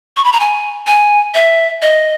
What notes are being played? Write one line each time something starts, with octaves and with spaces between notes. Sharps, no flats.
C#6
B5
A#5
G#5
G#5
E5
D#5